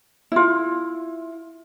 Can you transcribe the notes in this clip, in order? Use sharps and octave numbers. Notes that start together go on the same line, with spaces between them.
E4 F4